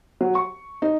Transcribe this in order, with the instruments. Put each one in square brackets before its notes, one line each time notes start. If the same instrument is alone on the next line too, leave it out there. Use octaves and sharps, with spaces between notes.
[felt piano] F#3
C#6
D#4